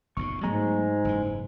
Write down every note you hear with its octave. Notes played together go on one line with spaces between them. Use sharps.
F#1 B1 A#2 C#6
G#2 F#3 G#3 A3 B3 A#5
F#1 E3